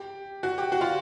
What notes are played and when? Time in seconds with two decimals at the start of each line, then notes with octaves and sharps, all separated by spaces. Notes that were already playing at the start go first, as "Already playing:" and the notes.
Already playing: G4
0.43 F#4
0.58 G4
0.72 F#4
0.81 F4